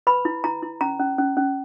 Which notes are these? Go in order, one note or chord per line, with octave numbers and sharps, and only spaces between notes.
B4 B5
E4
E4 A#5
E4
C#4 A#5
C#4
C#4
C#4